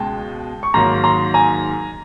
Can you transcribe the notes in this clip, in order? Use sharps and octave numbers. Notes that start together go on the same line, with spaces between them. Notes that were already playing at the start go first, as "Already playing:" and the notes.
Already playing: C#2 B2 G#3 G5 A5
C#6
G#2 D#3 F#3 A#3 A#5 C6
A#5 C6
G#5 A#5